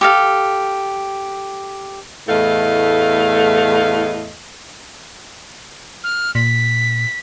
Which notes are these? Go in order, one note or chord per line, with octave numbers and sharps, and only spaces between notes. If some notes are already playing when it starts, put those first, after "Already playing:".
G4 A4 F5
E2 A2 A3 D#5 F5
F6
A#2 B6